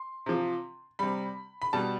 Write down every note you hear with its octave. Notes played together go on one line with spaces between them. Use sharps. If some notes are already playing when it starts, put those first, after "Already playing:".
Already playing: C6
C3 F3
C3 G3 B5
B5
B2 G3 A5